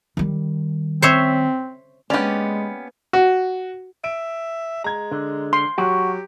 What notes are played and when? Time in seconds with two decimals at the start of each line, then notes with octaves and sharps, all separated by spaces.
0.17 D#3 G3
1.02 C4 C5 C#5 E5
2.10 G#3 A#3 B3 C#4 G4 B4 D5
3.13 F#4
4.04 E5 D7
4.84 G#3 A#5 G#6
5.12 D3
5.53 C6
5.78 F#3 F#4 G4